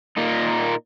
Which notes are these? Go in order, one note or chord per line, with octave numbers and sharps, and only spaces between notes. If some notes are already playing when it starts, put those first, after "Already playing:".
A#2 A#3 D#4